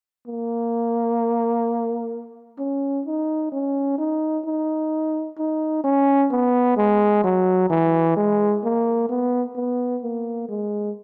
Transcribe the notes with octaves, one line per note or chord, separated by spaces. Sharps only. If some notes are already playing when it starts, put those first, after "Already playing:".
A#3
C#4
D#4
C#4
D#4
D#4
D#4
C#4
B3
G#3
F#3
E3
G#3
A#3
B3
B3
A#3
G#3